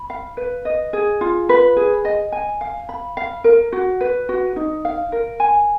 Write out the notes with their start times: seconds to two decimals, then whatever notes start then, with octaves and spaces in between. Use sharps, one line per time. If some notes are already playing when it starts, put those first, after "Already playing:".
Already playing: B5
0.10 F5
0.37 B4
0.65 D#5
0.93 G#4
1.21 F4
1.49 B4
1.77 G#4
2.05 D#5
2.32 G#5
2.61 F5
2.89 B5
3.17 F5
3.44 A#4
3.72 F#4
4.01 B4
4.29 F#4
4.56 D#4
4.85 F5
5.12 A#4
5.40 G#5